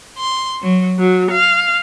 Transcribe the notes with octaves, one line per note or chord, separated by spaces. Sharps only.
C6
F#3
F#3
F5